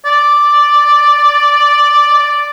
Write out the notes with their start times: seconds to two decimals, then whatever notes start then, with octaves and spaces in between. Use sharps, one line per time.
0.05 D5
2.14 D5